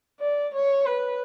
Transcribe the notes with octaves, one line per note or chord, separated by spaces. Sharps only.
D5
C#5
B4